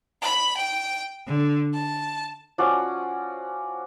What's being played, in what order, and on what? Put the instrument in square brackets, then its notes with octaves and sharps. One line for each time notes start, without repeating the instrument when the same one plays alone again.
[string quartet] B5
G5
D3
A5
[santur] F3 C#4 F#4 D5